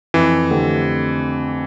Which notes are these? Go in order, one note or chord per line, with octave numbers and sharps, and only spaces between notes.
F2 E3
D3 A3 C4 G4